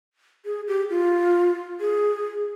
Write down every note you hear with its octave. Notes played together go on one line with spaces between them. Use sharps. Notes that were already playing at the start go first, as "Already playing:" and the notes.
G#4
G4
F4
G#4